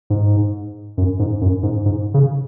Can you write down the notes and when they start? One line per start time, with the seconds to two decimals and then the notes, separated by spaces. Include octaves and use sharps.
0.10 G#2
0.98 F#2
1.19 G#2
1.41 F#2
1.63 G#2
1.85 G#2
2.14 C#3